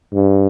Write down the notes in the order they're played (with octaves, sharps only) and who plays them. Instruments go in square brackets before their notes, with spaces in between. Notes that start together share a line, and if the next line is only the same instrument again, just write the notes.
[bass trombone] G2